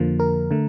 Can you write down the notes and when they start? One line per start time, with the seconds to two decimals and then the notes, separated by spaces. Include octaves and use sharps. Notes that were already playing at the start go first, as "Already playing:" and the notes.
Already playing: F2 D3 F3 A#3
0.20 A#4
0.51 D3 A3